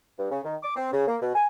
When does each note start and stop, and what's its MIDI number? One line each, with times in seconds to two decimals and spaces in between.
0.18 0.30 43
0.31 0.39 49
0.44 0.55 51
0.63 0.73 86
0.76 0.90 60
0.92 1.03 49
1.07 1.16 58
1.22 1.34 47
1.35 1.47 80